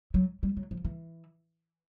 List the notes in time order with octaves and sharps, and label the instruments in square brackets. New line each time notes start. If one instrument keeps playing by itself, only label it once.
[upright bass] F#3
G3
F#3
F3
E3